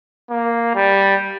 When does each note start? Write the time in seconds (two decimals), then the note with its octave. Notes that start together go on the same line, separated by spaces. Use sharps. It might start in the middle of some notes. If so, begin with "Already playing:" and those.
0.30 A#3
0.75 G3